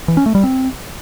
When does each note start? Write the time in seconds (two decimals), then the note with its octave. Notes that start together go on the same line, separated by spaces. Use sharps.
0.08 E3
0.17 C#4
0.26 A3
0.35 G3
0.44 C4